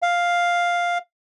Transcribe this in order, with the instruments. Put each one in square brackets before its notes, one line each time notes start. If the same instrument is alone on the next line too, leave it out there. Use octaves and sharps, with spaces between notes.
[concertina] F5